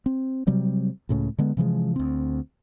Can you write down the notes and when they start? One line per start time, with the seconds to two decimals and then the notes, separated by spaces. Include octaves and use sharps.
0.06 C4
0.47 C3 F#3 G3 C4
1.09 C#2 A2 C#3
1.38 D3 G#3 B3
1.57 C3 E3 F3 G#3
1.96 D2 C4